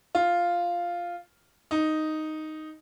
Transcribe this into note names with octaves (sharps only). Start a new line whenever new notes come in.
F4
D#4